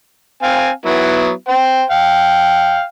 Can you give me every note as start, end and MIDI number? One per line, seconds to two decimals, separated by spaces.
0.43 0.69 60
0.43 0.69 77
0.43 0.69 80
0.86 1.30 54
0.86 1.30 59
0.86 1.30 64
1.48 1.83 72
1.48 1.83 79
1.90 2.83 77
1.90 2.83 79